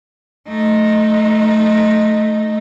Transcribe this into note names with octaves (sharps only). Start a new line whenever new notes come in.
A3 D#4